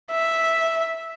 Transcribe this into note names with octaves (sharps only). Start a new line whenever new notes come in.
E5